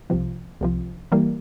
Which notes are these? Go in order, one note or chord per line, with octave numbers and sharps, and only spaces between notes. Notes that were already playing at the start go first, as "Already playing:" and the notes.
C2 C3 F3
C2 C3 F3
E3 G3 A#3